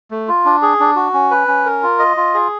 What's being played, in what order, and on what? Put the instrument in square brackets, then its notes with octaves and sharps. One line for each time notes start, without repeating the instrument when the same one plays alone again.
[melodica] A3
F4
D4
G#4
D4
F#4
C#4
B4
C#4
A#4
F4
D#5
F4
G#4